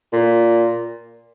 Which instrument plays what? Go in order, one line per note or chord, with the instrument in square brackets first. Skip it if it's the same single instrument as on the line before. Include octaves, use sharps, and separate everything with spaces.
[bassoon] A#2